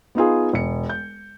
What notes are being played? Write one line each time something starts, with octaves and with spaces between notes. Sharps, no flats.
B3 D#4 F4 G#4
E1 C#7
G6